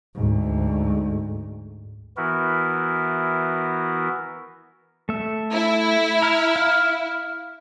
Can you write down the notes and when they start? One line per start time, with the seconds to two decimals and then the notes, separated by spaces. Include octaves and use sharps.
0.15 D2 G#2
2.17 E3 B3 E4 F#4 A#4
5.09 A3 E5
5.53 E4
6.22 A#5 F6
6.56 F5